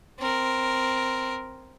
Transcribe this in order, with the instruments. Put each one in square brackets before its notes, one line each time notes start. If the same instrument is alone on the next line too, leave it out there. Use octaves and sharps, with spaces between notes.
[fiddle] C4 A#4